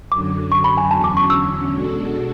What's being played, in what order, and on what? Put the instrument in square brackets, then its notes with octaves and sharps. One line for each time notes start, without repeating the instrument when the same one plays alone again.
[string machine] F#2 D3 F#3 [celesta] D6
[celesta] C#6
B5
G#5
[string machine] E2 D3 F#3 C#4 [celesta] A5
[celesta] D6
C#6
E6
[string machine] B2 G#3 D4 F#4 A4